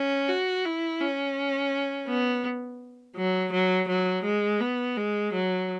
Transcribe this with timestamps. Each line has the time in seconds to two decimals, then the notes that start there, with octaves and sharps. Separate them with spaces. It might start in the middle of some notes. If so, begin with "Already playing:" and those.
Already playing: C#4
0.28 F#4
0.65 E4
1.01 C#4
2.08 B3
3.17 F#3
3.52 F#3
3.89 F#3
4.24 G#3
4.61 B3
4.97 G#3
5.33 F#3